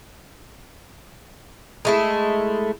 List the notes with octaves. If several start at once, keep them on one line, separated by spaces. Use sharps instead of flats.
G#3 A3 E4